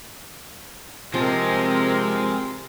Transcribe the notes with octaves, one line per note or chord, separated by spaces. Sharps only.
C3 F3 G#3 C4 A#4